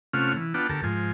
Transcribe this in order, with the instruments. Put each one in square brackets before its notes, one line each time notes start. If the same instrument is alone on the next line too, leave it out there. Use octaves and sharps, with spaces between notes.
[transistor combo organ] C3 A3 C#4 F4 F#5 F6
E3
B3 D4 F4 F#5 G5 A5
D2 G4 A4 A#4 A5
G#2 F3 G#5